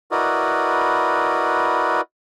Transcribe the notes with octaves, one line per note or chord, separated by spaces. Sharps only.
E4 F#4 A#4 B4 D5 D#5